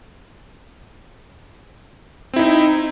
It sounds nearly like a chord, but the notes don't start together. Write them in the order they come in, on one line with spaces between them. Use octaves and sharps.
C4 E4 D#4